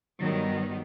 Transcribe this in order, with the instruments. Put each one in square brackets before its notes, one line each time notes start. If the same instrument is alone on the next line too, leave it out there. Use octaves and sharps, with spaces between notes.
[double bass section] G2 G3 [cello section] D#3 F#3 B3